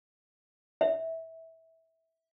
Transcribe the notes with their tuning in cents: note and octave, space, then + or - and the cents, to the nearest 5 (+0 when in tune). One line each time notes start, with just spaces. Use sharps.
E5 -20